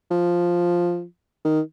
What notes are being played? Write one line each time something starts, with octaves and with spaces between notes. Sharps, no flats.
F3
D#3